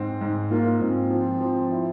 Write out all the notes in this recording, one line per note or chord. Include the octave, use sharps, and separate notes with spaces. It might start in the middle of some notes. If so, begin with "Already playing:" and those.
Already playing: G#2 C4
G#2
A#3 F4
G#2 C4
F3
F3
E4